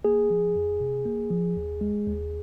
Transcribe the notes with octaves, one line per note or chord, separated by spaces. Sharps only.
A#3 G#4
F3
F2
C3
A#3
F3
D#2
G#3
D#2